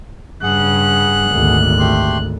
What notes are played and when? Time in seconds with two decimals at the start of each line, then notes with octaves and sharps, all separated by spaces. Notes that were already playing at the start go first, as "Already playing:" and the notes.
0.43 G2 C#3 G#4 F#5 F#6
1.32 G#1 D2 A#2
1.79 A3 G4 C6